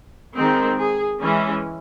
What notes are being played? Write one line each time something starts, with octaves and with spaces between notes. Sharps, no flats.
D#3 G#3 C4
G#4
E3 G#3 C#4